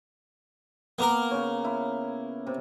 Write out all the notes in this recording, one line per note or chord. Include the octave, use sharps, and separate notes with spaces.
A#3 B3 A#4 D6
C#3 C#5
E4
C3